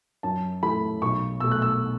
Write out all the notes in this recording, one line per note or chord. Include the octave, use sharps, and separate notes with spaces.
F#2 A5
E3 A3 B5
B1 C#6
B2 F#3 A3 E6
F#6
E6